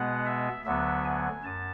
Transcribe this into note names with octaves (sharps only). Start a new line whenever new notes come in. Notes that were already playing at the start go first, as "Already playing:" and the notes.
Already playing: B2 G#3 B3 F#5
E5
D2 D3 F#3 B3 E5
G#5
F#2 A5